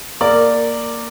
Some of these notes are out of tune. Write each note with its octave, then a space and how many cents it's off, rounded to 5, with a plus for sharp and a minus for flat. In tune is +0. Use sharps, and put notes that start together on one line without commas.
A#3 +0 A#4 -15 D5 +0